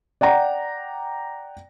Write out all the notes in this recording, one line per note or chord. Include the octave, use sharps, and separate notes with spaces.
D5 F#5 G5 A#5